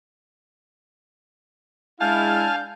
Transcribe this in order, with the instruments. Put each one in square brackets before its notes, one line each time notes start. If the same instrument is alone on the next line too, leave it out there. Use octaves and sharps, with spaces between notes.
[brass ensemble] G#3 E4 [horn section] D4 F5 [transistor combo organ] G#5 A5 F6 [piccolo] G6